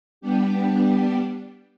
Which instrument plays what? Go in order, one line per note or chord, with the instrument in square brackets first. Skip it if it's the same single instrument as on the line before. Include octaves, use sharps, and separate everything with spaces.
[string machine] G3 B3 D4 G4